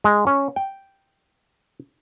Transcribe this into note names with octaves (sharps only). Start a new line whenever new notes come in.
G#3
C#4
G5